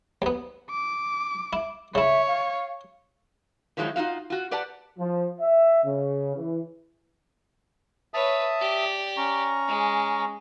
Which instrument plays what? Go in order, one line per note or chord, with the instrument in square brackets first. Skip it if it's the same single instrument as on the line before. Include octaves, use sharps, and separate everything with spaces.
[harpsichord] D#2 B3
[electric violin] D6
[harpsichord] E4
[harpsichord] C#3 E4 [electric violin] C#5 [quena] E5
[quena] F5
[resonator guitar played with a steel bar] D#3 F3 F#3 G#3 D#4 E4
D#4 F4 F#4 F5
F4 F#4
G4 B4 D5 F#5 A5
[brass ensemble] F3
E5
C#3
E3
[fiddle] B4 C#5 [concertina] E5 A5 D#6
[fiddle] G4 D5
[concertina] C#4 A#5 C#6
[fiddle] G#3